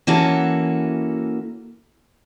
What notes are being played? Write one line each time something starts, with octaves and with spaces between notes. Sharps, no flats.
E3 A#3 C#4 F#4 A4